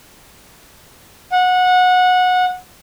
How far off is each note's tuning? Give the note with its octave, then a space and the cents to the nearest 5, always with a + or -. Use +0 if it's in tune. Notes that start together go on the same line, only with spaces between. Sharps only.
F#5 -20